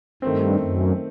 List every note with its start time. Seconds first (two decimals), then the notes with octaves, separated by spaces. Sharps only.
0.22 G2 D#3 A3 C4
0.59 F#2